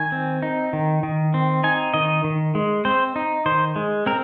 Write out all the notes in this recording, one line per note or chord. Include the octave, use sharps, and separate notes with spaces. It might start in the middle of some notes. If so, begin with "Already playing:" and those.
Already playing: D#3 G#5
C4
D#4
D#3
D#3
C4
D#4 G#5
D#3 D#5
D#3
G#3
C4 C5
D#4
D#3 C5
G#3
C4 A#4